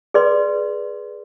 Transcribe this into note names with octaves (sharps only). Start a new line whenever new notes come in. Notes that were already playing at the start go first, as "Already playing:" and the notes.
G#4 B4 D5 C6